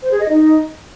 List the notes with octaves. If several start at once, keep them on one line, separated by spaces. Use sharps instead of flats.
C5
G#4
D#5
D#4